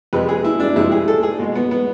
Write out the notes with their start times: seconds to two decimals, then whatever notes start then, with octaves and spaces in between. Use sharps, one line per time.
0.13 F2 C3 G#3 B4
0.29 G#4
0.44 E4
0.60 D4
0.76 F2 C3 G#3 E4
0.92 G#4
1.08 A4
1.23 G#4
1.39 B2 G#3
1.55 B3
1.71 B3